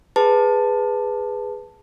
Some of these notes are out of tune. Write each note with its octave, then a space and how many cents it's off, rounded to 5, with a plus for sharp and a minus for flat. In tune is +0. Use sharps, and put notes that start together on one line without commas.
G#4 -5 B4 +0 A5 +5